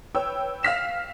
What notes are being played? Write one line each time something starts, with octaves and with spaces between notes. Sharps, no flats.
B4 C#5 G5 E6
F5 F6 B6 E7